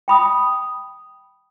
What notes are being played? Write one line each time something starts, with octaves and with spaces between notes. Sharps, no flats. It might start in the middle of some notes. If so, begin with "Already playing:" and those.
G5 B5 D#6